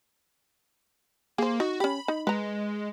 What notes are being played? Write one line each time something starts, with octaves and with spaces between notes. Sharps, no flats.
A#3 G#4 C5
D#4 F#4
C#4 G4 B5
D#4
G#3 B4 A#5